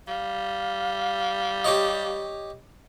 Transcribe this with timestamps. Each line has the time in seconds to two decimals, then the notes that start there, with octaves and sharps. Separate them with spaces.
0.08 G3 F5
1.64 G4 C#5 D#5